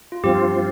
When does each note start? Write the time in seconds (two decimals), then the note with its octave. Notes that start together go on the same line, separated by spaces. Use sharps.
0.12 F4
0.24 G2 F3 C4 F4 G4